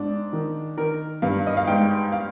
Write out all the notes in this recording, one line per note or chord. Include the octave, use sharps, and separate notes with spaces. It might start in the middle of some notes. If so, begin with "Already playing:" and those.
Already playing: G#2 D4
D#3
D#3 A#4
G2 F5
D#5
F5
G#2 G5
F5